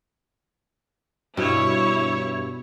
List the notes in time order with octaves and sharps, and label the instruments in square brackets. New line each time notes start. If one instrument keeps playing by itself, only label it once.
[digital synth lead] G2 [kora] B2 [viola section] E4 C#5